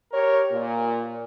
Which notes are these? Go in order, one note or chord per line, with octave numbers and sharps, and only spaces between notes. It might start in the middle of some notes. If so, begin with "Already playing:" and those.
G4 A#4 C#5
A#2